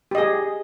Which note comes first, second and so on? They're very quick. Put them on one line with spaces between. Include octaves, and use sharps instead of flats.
G4 D#5 G#4